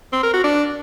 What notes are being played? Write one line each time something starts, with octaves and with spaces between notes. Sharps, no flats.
C4
A#4
F#4
D4